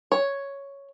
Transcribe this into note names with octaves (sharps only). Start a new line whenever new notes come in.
C#5